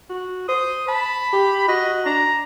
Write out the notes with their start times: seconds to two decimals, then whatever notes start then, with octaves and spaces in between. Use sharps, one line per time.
0.10 F#4
0.48 C5 D#6
0.88 A5 B5
1.33 G4
1.68 F#4 D#5
2.05 D4 A#5